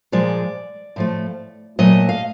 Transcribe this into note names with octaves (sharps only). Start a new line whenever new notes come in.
A#2 F3 G#3 D5
A2 F3 A3
A#2 F#3 A3 D#5
F5